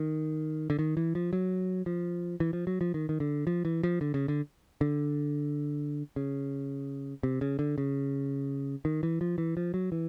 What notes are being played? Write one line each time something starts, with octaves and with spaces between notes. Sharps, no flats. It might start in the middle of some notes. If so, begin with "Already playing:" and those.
Already playing: D#3
D3
D#3
E3
F3
F#3
F3
E3
F3
F#3
F3
D#3
D#3
D3
F3
E3
F3
D3
C#3
D3
D3
C#3
C3
C#3
D3
C#3
D#3
E3
F3
E3
F3
F#3
E3